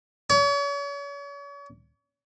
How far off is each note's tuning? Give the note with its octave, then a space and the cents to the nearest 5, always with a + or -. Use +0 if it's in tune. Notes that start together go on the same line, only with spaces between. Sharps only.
C#5 +40